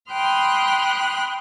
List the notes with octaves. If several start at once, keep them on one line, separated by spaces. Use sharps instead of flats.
G5 B5 C6 D#6 F6 F#6